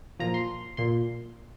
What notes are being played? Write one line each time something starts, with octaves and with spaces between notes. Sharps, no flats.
A#2 F3 A#5
C6
A#2 C6